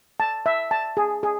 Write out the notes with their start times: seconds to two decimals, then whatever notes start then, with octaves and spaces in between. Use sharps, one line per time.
0.20 A5
0.46 E5
0.71 A5
0.97 G#4
1.23 G#4